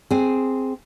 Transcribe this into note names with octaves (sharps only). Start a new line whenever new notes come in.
C4 G#4